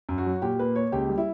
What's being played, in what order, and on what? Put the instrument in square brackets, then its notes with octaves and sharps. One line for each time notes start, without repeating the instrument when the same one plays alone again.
[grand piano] F#2
[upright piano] F#4
[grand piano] F#3
[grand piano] A#2 [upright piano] G4
[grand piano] A#3 [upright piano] B4
[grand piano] A#3 [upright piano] C#5
[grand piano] C#2 [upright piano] G4
[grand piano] G3
[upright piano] E4